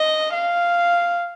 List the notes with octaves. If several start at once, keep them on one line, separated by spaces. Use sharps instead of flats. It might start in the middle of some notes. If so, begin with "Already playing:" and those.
Already playing: D#5
F5